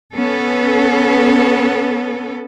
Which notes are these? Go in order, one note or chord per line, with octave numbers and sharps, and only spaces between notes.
B3 C#4 A4